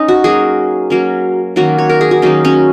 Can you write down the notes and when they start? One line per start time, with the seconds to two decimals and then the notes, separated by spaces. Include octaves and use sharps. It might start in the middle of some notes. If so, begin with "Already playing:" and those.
Already playing: C#4 D#4
0.08 F#4
0.24 F#3 A#3 C#4 G#4
0.90 F#3 A#3 C#4
1.56 D#3 F#3 A#3 C#4 F#4
1.78 C#5
1.89 A#4
2.01 G#4
2.11 F#4
2.22 D#3 F#3 A#3 C#4 D#4
2.45 C#4